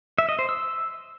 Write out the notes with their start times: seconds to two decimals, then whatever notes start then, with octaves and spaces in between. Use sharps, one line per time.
0.18 E5
0.29 D#5
0.39 C5
0.49 E6